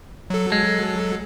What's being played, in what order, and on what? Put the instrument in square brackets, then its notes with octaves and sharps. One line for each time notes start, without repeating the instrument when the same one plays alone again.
[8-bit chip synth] F#3 A4
[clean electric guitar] G#3